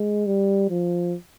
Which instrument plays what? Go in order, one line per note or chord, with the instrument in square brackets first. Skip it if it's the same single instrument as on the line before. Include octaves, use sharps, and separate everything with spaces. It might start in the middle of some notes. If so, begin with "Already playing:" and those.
Already playing: [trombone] G#3
G3
F3